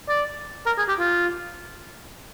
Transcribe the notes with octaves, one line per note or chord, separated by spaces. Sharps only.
D5
A#4
G#4
G4
F4